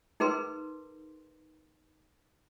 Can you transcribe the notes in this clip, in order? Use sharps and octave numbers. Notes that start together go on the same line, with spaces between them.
D#4 G#4 A#4 B4 C6